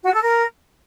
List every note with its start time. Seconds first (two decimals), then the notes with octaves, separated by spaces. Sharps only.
0.05 F#4
0.14 A4
0.22 A#4